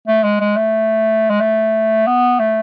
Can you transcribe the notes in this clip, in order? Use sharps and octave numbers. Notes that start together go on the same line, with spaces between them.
A3
G#3
G#3
A3
G#3
A3
B3
A3